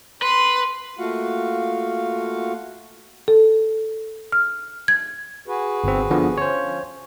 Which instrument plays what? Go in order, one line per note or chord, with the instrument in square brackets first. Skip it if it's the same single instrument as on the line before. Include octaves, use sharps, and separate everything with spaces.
[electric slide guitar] B4 [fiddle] C6
[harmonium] A3 A#3 F4 F#4 F5 F#5
[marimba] A4
F6
G#6
[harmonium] F#4 G#4 B4
[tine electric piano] G1 C4
D3 F3 B3
[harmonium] F3 C#4 [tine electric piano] C5 C#5